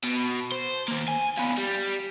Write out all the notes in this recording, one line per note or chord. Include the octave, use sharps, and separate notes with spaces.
B2
C5
D#2 A#3
G#5
F3 B3
G3